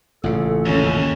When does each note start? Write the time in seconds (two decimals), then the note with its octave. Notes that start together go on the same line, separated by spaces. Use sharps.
0.24 A1 A#2 C#3 A4
0.66 D#2 C#4